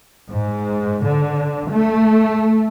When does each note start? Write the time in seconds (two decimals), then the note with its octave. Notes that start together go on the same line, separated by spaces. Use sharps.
0.30 G#2
1.05 D3
1.71 A3